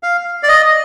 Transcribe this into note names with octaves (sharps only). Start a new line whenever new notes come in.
F5
D5
D#5